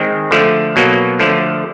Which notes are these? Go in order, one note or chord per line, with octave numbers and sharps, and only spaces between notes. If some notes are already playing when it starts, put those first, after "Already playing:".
Already playing: D#3 G#3 C4
D3 F3 A3
B2 F#3 A#3
D3 F3 A3